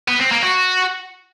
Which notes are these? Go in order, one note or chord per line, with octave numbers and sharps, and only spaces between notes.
B3
C4
A#3
F#4